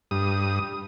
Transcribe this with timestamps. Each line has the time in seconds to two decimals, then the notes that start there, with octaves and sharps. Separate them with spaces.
0.11 G2 D#6